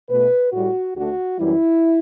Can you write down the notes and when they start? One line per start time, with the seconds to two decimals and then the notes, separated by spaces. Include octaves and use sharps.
0.09 B2 A3 B4
0.52 A2 G3 F#4
0.95 D2 D3 A3 F#4
1.38 F#2 E3 G3 E4